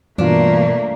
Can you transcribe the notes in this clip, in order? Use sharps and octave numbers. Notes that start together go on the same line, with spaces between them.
G2 B2 E3 A3 A#3 D4 F4